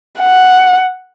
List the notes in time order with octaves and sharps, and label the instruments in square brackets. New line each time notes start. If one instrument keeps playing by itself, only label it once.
[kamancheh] F#5